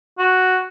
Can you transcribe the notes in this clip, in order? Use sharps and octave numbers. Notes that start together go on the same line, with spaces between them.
F#4